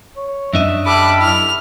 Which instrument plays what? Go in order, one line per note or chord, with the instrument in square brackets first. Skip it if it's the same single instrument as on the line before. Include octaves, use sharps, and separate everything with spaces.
[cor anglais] C#5
[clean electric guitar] F#2 D4 D#5 [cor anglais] E5
[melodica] G3 A4 B5 [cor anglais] E5 [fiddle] D6 F#6
[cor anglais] E4 [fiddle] F6